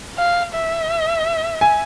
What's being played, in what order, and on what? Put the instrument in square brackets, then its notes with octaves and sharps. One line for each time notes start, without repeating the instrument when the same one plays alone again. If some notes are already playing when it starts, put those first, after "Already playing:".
[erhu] F5
E5
[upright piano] G#5